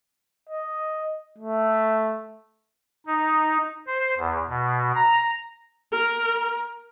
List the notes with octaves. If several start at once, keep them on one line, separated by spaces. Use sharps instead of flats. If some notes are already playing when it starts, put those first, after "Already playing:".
D#5
A3
D#4
C5
E2
B2
A#5
A#4